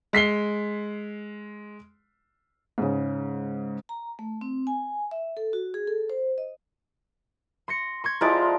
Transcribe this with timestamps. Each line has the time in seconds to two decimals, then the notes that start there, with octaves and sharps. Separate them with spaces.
0.13 G#3 B6 C7 G7
2.78 G#2 C#3
3.89 A#5
4.19 A3
4.41 C4
4.67 G#5
5.11 E5
5.37 A4
5.53 F#4
5.74 G#4
5.87 A4
6.10 C5
6.38 D#5
7.68 C6 A#6 C#7
8.04 C6 C#6 G#6
8.21 F3 G#3 E4 G4 A#4 D5